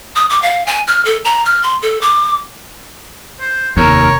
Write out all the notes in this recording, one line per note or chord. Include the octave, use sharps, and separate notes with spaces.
D#6
D6
F5
G#5
F6
A4
A#5
F6
C6
A4
D6
C5
F1 D#2 A#4 C#5